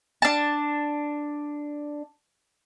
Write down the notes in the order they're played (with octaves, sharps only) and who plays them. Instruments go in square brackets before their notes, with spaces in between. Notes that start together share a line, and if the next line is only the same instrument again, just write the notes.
[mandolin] D4 A5